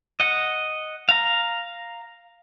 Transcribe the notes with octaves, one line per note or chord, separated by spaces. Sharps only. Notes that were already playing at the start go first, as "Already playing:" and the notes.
D#5 F#5
F5 A#5